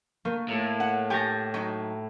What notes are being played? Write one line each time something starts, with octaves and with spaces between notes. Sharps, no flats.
A3 A#3
A2
F#5
G4 C#5 G5 G#5 A6 A#6
F#3 D#4